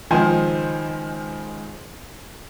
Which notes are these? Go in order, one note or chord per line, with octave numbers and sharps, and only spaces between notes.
C#2 D#3 F3 C5 G#5